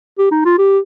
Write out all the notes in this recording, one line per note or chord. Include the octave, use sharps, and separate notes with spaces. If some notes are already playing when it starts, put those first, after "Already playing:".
G4
D#4
F4
G4